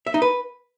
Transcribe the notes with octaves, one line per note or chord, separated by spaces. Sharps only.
E5
D#4
B4